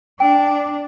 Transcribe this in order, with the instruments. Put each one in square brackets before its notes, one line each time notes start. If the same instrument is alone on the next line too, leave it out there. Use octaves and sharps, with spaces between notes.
[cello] D4 [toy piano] G5